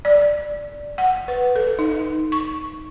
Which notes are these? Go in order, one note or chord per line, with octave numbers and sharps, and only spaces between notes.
D5
F#5
B4
A4
D#4
C#6